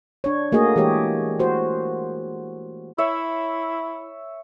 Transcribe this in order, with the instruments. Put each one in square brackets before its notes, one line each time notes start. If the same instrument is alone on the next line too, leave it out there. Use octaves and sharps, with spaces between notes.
[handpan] D4 C#5
A3 A#3 F#4 G#4 D#5
E3 G#3 G4 C#5
F#4 C5
[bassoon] E4 [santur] C#5 E5